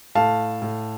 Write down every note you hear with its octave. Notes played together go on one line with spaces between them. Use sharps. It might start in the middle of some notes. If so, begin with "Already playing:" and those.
A2 F5 A5
A2